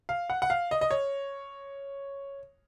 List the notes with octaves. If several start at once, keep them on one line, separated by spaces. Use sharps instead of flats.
F5
F#5
F#5
F5
D#5
D#5
C#5